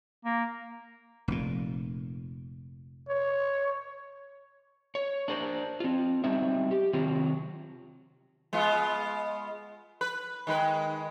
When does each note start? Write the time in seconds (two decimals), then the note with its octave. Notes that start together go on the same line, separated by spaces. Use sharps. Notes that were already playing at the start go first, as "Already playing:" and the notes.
0.25 A#3
1.28 F1 A#2
3.08 C#5
4.95 C#5
5.28 D4 A#4 C5
5.80 C4 F4
6.24 F#3 G3 C4 D#4 E5
6.71 G4
6.93 C3 D#3 F#3 C4 F4
8.53 G#3 B3 F4
10.01 B4
10.47 D#3 G#3 B4